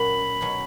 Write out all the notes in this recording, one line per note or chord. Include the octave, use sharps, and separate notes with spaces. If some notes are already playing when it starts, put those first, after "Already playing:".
Already playing: A#2 F#3 C#4 F#4 B5
B2 F#3 C#4